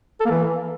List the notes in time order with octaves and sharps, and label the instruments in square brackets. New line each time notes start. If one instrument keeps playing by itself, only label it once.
[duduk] A4
A#3
E3